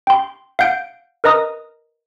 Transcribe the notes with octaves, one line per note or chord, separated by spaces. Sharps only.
G5 C6
F5 F#5 G6 D7
A#4 B4 D#5 A#5 D#6